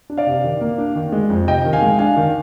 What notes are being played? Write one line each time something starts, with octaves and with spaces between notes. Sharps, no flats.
D4
D5 F5
C3
D#3
A#3
D4
D#3
G#3
F2
C3 D#5 G5
D#3
F5 G#5
G#3
D4 F5 G#5
D#3